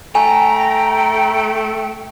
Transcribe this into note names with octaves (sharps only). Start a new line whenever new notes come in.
A3 G5 G#5 A#5